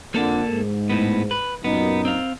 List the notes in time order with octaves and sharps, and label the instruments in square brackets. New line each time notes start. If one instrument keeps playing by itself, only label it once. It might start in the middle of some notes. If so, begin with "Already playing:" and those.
[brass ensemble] F2 D3 [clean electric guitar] A#3 A4
[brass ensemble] G#2
[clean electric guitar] A2 B3
B4
[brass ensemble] F#2 A#2 D#4 [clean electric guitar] B3
[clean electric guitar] C4 F5